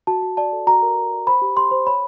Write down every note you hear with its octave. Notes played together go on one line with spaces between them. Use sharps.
F#4 A5
F#4
D5 A5
A4
F#4 A#5
A#4
A#4
D5
C5 B5
G4
G4 C6
C5
C#5 B5